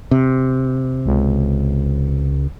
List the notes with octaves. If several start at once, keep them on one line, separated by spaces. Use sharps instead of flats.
C3
C#2